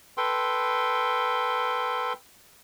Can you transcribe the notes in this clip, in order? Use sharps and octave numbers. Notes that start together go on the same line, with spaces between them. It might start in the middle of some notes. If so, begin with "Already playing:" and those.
A4 B4 G5 C6